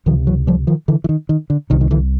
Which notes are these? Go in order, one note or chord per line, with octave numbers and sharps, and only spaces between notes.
C#2 C3 D#3 F3
E3 F#3
F3 G3
D#3 F3
D3 E3
E3
D#3
D#3
D3
C2 C3 D#3
D#3
D3 E3